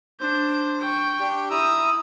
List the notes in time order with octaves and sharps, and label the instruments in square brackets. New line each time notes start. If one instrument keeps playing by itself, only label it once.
[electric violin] D4 G6 [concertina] C5
[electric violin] G5 C#6
[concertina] D4 G4
[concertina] E4 A#5 [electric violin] D#6 E6